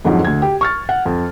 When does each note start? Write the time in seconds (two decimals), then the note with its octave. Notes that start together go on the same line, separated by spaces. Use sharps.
0.05 F2 G#2 D3 F3 F#3
0.25 D2 G#6
0.42 G4
0.61 C#6 F6 A6
0.89 F#5
1.06 F2